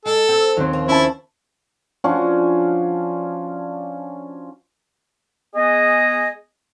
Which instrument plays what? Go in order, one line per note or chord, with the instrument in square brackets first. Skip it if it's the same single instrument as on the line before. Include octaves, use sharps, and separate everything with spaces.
[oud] G#3 [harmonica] A4
[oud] C4
[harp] D#2 C4 [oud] F#3
[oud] F3
[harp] C#4 A5 [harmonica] E4
[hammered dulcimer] F3 C#4 D4 F#4
[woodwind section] G#3 B3 G#4 D#5